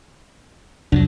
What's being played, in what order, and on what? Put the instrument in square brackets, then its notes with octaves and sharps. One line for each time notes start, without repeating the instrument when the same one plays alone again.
[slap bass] C2 F3 F#3 [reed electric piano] F2 D4